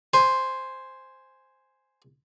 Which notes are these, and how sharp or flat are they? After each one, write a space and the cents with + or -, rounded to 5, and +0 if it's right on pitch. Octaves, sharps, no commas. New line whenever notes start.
C5 +0 G#5 +0